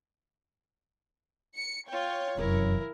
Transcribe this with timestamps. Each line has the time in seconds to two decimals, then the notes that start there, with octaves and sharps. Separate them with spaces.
1.56 C#7
1.89 F4 C#5 G5
2.37 F1 F#2 E3 E4 A#4